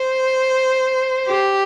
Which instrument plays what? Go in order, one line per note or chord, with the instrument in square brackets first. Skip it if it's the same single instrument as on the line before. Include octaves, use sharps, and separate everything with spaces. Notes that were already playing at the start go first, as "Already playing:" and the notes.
Already playing: [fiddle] C5
G4